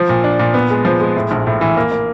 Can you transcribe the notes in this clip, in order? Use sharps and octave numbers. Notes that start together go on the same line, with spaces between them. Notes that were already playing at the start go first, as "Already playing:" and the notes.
Already playing: F3
A#2
D4
A#2
B3
G#3
F3
G#3
A2
A#1
A2
E3
A#3
A#3